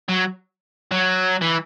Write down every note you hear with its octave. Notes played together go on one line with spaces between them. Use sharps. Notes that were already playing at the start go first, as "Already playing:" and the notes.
F#3
F#3
E3